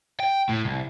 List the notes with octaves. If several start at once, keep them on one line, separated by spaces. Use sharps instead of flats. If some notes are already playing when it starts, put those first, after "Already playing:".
G5
A2
C2